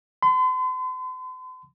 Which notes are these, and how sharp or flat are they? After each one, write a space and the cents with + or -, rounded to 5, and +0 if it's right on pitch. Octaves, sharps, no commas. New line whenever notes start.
C6 -45